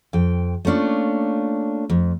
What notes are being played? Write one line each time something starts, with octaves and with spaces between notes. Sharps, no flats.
F2 G5
A3 A#3 C#4 D4 F4
F2